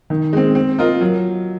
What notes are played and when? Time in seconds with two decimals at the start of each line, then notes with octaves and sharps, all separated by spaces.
0.10 D#3
0.33 G#3 C4
0.55 C4
0.79 F4 A#4 D#5
1.01 F#3